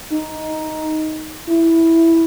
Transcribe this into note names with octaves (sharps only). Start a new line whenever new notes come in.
D#4
E4